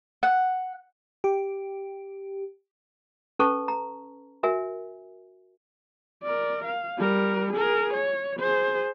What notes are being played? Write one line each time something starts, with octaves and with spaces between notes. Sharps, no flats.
F#5
G4
C#4 A4 B4 A5 C#6
A#5
F#4 A#4 E5 G#5
A#4 D5
F5
G3 A#4
G#4 A#4
C#5
G#4 C5